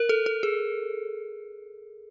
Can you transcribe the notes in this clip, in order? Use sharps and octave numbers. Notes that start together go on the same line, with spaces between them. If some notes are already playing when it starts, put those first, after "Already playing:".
Already playing: A#4
A4
A4
G#4